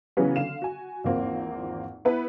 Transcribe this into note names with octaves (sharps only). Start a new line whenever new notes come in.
C#3 E3 F#3 B3 C#4
D3 F5 E7
F#4 G#5
G#1 E2 F3 A#3 C4
B3 E4 B4